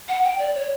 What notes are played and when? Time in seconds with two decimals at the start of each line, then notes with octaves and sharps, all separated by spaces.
0.08 F#5
0.24 G5
0.39 D5
0.55 C#5